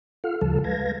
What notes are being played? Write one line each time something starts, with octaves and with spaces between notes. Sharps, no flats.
F4 A4 F5 F#5 F6
D2 C#3 F3 G3 A4 A5
G#3 B4 F5 G#6 A#6